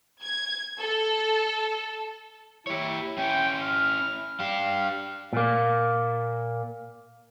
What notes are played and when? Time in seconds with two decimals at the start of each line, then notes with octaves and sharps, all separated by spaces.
0.22 G#6
0.80 A4
2.67 E4 G4 C#5
3.18 C#4 E4 G5
3.61 F6
4.40 D4 G4 F5
5.33 A#2 A#3